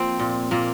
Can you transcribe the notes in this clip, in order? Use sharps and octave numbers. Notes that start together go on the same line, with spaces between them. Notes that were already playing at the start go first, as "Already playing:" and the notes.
Already playing: F3 A#3 C4
A#2
A#2 A#3